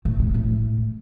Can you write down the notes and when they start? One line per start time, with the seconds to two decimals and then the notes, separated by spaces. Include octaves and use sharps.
0.05 A2
0.19 C3
0.34 A2